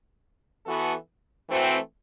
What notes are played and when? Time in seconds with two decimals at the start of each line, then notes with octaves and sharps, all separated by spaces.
0.65 E3 B3 F#4 A4
1.47 E3 A3 C4 F#4